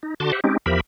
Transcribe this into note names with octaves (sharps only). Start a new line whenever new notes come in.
D#4
D3 F#4 A5 C6 D6
G4 C5 E5 F#5
G#3 C4 C#4 D#4 G4
E2 F3 G4 A#4 E5 B5